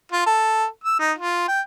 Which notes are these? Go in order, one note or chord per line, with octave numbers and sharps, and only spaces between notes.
F4
A4
E6
D#4
F4
G5